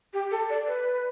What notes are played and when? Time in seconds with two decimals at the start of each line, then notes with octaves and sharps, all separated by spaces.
0.13 G4
0.31 A4
0.50 D5
0.67 B4